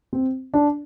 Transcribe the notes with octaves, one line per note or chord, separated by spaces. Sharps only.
C4
D4